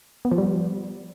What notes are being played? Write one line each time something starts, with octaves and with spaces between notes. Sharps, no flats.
B3
F3
G3